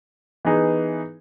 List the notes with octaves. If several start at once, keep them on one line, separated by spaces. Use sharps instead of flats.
E3 B3 D#4 G#4